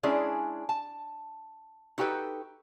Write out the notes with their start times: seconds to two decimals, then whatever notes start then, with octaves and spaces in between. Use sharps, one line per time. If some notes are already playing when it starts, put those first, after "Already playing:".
0.03 G#3 C#4 D4 E4 G#4 D5
0.69 A5
1.98 D#4 F#4 G4 A4 B4